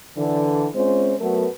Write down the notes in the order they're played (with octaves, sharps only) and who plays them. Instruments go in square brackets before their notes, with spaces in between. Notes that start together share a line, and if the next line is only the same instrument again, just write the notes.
[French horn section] D3 E3
G#3 C4 C#4 F4 C5
F#3 A3 B3 F#4 A4 A#4